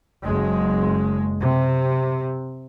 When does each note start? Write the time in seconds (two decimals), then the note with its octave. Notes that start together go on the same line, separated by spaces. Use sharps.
0.24 F#1 G#3
1.40 C3